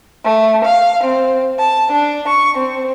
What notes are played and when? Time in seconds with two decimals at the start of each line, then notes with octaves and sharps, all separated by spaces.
0.24 A3
0.65 F5
1.04 C4
1.58 A5
1.92 D4
2.27 C#6
2.58 C4